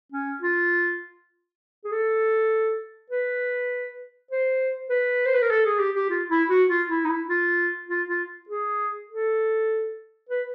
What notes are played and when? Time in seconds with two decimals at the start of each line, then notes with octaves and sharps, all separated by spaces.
0.12 C#4
0.42 F4
1.84 G#4
1.91 A4
3.10 B4
4.31 C5
4.89 B4
5.26 C5
5.34 B4
5.42 A#4
5.50 A4
5.65 G#4
5.79 G4
5.95 G4
6.10 F4
6.29 E4
6.50 F#4
6.70 F4
6.89 E4
7.05 D#4
7.09 E4
7.29 F4
7.89 F4
8.09 F4
8.49 G#4
9.09 A4
10.29 B4